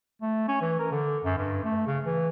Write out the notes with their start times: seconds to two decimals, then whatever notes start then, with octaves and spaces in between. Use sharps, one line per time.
0.22 A3
0.49 C#4
0.62 E3
0.79 A#4
0.91 D3
1.24 F#2
1.38 G2
1.65 A3
1.87 C#3
2.05 E3